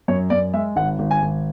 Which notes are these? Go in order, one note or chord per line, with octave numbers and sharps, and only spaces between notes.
F#2 C#5
F#2 D5
G#3 E5
G#1 F#5
G#1
G#5
G#1